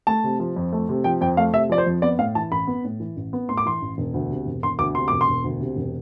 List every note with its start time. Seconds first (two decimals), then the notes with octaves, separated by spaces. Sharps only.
0.07 A3 A5
0.24 C3
0.40 F3
0.56 F2
0.73 A3
0.89 C3
1.04 F3 G5
1.21 F2 G5
1.37 A3 F5
1.53 C3 E5
1.69 F3 D5
1.78 C5
1.86 F2
2.02 B3 D5
2.19 A2 F5
2.35 E3 A5
2.51 A1 B5
2.67 B3
2.84 A2
3.00 E3
3.17 A1
3.33 B3
3.49 A2 C6
3.57 D6
3.65 E3 C6
3.82 A1
3.98 E1
4.14 D2
4.30 C3
4.46 E1
4.63 E1 C6
4.79 D2 D6
4.95 C3 C6
5.08 E1 D6
5.21 C6
5.28 E1
5.44 D2
5.60 C3
5.76 E1